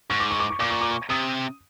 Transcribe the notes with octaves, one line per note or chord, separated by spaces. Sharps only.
G#2 C#6
D6
C#6
D6
C#6
A#2 D6
C#6
D6
C#6
C3 D#6